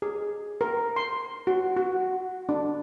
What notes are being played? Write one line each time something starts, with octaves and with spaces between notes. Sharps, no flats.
G#4
A#4
C6
F#4
F#4
D4